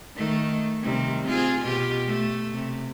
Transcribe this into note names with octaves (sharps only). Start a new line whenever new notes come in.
D#3 A3
C3 D#3 G3
C4 F4 G#4
B2 F4 G4
A3
C3